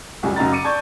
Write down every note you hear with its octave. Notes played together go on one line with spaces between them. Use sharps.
C#2 F#2 G3 G#5
F#2 C#3 D#4 A#5 A6
D6 C#7 D#7
D5 A5 C#6 G6 G#6